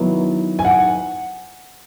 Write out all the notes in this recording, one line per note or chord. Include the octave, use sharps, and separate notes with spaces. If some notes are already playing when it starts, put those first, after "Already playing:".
Already playing: D#3 F#3 B3 E4
G#5
F#5